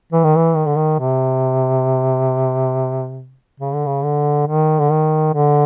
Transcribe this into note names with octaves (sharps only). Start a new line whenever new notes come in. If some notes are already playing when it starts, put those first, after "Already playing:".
E3
D#3
E3
D#3
D3
D#3
C3
C#3
D3
C#3
D3
D#3
D3
D#3
D3